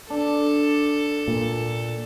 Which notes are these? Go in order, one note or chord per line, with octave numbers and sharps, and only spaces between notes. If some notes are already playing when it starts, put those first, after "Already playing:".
D4 A4
A#2